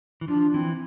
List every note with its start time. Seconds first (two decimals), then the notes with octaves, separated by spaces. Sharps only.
0.21 E3
0.28 F3 D4
0.54 E3 C4